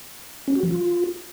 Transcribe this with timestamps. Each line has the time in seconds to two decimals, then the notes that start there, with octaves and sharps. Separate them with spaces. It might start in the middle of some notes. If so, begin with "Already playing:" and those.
0.48 C#4
0.55 F#4
0.63 F3
0.71 F4